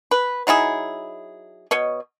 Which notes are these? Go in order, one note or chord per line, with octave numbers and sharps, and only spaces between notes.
B4
F#3 D#4 E4 G#4
B2 C#5 D#5